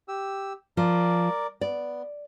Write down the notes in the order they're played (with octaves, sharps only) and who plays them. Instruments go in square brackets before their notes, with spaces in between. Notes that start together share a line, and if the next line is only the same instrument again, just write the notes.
[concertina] G4 E6
[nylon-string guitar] F3 [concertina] A#4 D5
[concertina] B3 [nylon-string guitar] D5